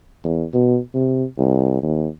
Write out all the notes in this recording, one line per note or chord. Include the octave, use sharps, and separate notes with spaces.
E2
B2
C3
C2
D#2